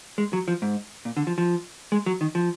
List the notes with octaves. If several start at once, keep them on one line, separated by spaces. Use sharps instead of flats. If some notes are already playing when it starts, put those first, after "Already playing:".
G#3
F#3
F3
G#2
A#2
D3
F3
F3
G#3
F#3
D#3
F3